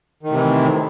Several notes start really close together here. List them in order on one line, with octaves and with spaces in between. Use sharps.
D#3 A2 C3 E3